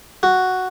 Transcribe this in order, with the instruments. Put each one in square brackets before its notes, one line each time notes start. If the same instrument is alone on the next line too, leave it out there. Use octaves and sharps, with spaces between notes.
[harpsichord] F#4